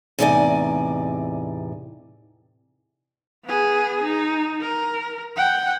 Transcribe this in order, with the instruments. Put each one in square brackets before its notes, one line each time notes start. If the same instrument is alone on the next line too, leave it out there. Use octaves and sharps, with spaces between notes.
[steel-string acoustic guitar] E2 A2 C3 D#4 D5 G#5
[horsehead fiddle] B3 G#4
D#4
A#4
F#5 G5